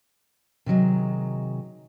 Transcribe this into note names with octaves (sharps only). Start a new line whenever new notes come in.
C3 D#3 F#3 G#3